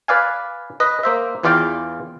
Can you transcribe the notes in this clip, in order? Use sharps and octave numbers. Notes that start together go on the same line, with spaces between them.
B4 D5 F5 G#5
B4 D#5
A#3 C5 E5
E2 E3 F4 D5 F5 G5